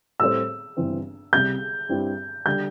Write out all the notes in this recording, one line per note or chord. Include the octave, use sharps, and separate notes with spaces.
A2 G3 C4 A4 C5 E6
G1 G2 E3 C4
C2 C3 G3 G6
G2 G3 C4 E4
D3 G3 G6